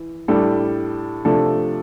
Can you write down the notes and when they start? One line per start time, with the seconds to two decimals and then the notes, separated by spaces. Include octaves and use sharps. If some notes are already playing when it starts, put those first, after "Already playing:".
Already playing: E3
0.28 A2 G3 D4 A4
1.25 C3 F3 A3 D4 A4